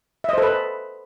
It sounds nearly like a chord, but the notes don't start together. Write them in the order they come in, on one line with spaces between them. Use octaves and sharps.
E5 D#5 C5 A4 B4